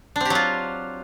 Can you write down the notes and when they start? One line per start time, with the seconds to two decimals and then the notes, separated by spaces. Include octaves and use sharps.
0.16 D4
0.21 C4
0.25 G4
0.30 F#3
0.35 F4